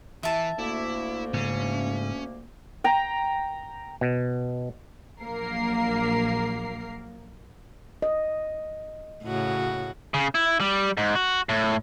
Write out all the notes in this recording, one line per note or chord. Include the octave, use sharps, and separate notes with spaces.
E3 E5 A5
D2 A3 A#3 E4
G#2 C#3 C#4
G5 A#5
B2
A#1 F#3 A#3 A#4 C7
D#5
A2 C#3 F#4
C#3
E4
G3
G#2
F#4
A2